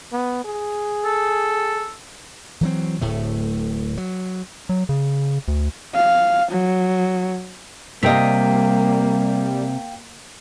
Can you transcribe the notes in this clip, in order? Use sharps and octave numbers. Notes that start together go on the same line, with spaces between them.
B3
G#4
A4
E3 F#3 C4
D1 A2 A3
F#3
F#3
C#3
D2
F5
F#3
C3 G3 A#3 D#5 F5 G5 B6